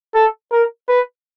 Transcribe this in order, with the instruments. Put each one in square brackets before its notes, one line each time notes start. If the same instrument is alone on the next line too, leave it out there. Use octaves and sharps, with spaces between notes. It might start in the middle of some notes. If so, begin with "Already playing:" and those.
[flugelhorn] A4
A#4
B4